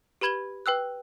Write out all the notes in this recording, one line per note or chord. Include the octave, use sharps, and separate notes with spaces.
G4 B4 B5 G#6 F#7 G7
B4 G5 E6 F#6